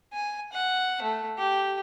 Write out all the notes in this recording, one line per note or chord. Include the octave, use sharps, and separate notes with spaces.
G#5
F#5
A3
G4